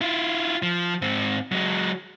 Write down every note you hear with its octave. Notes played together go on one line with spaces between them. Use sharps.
E4 F4
F3
G#2 C4
F#3 G#3